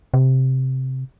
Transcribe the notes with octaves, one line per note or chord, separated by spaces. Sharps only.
C3